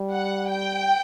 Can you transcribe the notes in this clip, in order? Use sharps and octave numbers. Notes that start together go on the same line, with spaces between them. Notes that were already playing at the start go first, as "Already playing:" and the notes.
Already playing: G3
F#5
G5